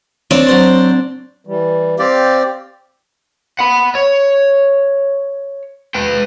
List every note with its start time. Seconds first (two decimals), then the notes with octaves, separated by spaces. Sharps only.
0.31 C4 D4 C#5 D5
0.47 F#3 C5 C6
1.47 E3 G3
1.99 C4 G4 D5 F5
3.59 F#5 B5
3.95 C#5
5.95 B4 G5